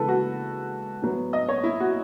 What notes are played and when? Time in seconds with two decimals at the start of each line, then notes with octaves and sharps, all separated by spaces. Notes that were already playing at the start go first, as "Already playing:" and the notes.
Already playing: C#3 E3 G#3 B3 A4 B4
0.08 F#4
1.02 A2 F#3 B3
1.33 D#5
1.49 C#5
1.64 E4
1.80 F#4